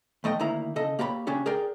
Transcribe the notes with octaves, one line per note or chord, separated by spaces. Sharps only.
D#2 A3 D#5 G5
D2 D#3 A#3 E4 A#5
C#3 A4 D#5
A#3 G4 C#5 A5 B5
C#3 C#4 D4 G4 C#5
G#4 A#4 D5 G5